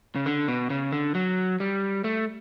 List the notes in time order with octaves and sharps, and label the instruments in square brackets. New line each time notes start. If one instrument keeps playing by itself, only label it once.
[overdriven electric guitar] C#3
D3
B2
C#3
D3
F#3
G3
A3